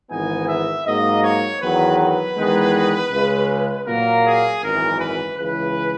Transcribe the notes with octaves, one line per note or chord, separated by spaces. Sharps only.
G#1 G#2 E3 B3 D#4 G#5
E5
G#2 F#3 A#3 D#5
C#5
E2 D#3 F#3 B4
B4
E2 D#3 G#3 B3 D#4
C#2 C#3 G#3
A#2 F#3 A#3 A#4
G#4
G#1 F#2 E3 A#4
B4
C#2 C#3 E3 B4